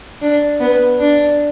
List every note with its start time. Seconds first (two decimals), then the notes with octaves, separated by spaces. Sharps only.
0.21 D4
0.60 B3
0.99 D4